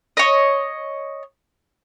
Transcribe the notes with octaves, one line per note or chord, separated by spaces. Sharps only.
C#5 D#5